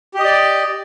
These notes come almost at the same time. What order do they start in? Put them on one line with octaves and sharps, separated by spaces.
G4 D#5 D5